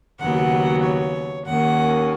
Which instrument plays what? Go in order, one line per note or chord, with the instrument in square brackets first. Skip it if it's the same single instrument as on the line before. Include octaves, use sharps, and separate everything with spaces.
[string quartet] D#2 C#3 F#3 B3 F#5
C#5
D#2 D#3 A#3 C#4 F#5